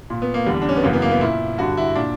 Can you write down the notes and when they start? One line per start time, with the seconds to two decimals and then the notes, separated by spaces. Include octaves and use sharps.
0.10 A#2
0.22 B3
0.34 A#3
0.46 E2 D3 G3
0.62 D4
0.69 C#4
0.76 B3
0.83 F#2 C#3 E3 A#3
0.93 B3
1.02 A#3
1.11 B3
1.21 A#2 E4
1.58 G2 D3 F#4
1.77 E4
1.95 A#2 D4